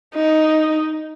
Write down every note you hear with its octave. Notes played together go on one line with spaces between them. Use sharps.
D#4